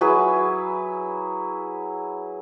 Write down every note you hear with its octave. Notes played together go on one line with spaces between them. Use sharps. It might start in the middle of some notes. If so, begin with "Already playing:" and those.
F#3 E4 G#4 B4